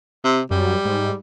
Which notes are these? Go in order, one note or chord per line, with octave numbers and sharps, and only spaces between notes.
C3
F#2 G3
G#2